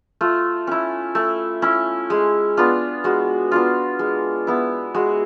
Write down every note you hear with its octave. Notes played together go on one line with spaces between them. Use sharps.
A3 F4
C#4 E4
A3
C#4 E4
G#3
B3 D4 F4
G#3 F#4
B3 D4 F4
G#3
B3 E4
G#3 F#4